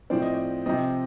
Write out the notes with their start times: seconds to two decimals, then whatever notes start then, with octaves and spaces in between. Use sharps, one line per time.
0.10 A2 F3 C4 D5
0.22 D#5
0.34 D5
0.66 C3 F3 C4 D#5